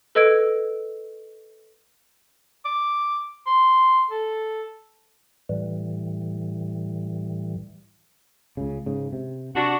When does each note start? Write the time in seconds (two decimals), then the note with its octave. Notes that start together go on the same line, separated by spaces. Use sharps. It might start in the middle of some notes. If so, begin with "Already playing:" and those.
0.15 A4 B4 D#5 E6 G#6 D7
2.65 D6
3.47 C6
4.11 A4
5.49 A2 E3 G3
8.57 C#2 C#3
8.86 G#2 C#3
9.12 C3
9.55 C3 D4 F#4